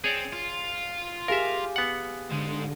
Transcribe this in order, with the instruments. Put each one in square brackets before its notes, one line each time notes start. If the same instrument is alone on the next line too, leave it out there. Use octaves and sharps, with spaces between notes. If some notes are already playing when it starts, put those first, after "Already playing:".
[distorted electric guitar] C4 [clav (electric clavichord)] G#4 C#5 D5
[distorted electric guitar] F4
[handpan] G4 G#4 F5 [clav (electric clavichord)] A#4 E5
[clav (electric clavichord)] B3 F#5
[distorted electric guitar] G#2 G#3 [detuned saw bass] D3